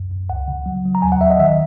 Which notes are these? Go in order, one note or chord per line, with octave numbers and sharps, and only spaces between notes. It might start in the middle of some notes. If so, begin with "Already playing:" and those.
Already playing: F#2
F#2
C#2 F#5
C#3
F#3
F#3
A#5
D#2 G#5
F#5
D#2 E5
D#5
D#3 E5